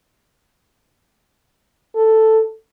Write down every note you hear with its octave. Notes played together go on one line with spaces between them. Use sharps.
A4